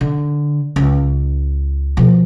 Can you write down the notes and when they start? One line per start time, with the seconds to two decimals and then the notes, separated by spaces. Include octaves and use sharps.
0.01 D3
0.76 C#2
1.97 B2 F3